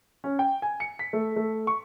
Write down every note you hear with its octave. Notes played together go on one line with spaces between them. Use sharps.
C#4
G5
G#5
C#7
B6
A3
A3
C#6